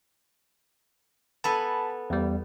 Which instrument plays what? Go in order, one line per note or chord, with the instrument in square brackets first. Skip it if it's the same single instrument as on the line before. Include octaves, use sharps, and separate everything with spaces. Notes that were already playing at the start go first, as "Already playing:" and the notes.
[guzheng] B3 A4 G#5 [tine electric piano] A5 B5
[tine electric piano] E2 G3